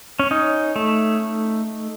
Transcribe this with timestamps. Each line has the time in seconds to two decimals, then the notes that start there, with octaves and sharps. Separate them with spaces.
0.19 C#4
0.31 C#4 D#4
0.76 A3